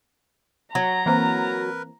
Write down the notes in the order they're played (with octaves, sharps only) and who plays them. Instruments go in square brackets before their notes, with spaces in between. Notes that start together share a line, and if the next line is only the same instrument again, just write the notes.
[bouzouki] F#3 [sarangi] A#5
[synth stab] E3 A#3 C4 [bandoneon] A#4 B4